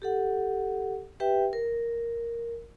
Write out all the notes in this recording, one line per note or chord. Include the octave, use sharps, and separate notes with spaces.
G4 A4 F#5
G4 B4 E5 G5
A#4